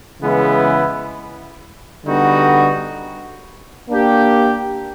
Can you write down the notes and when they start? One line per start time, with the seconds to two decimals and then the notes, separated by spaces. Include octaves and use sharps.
0.21 C#3 E3 G#3 B3 E4
2.05 D3 G3 B3 D#4 F#4
3.89 A#3 D4 G4